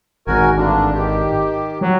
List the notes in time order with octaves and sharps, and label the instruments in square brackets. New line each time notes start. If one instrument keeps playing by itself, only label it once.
[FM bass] G#1 [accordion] F#4 A#4 G#5
[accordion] G2 D3 D4
D#3 G4
[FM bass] F#3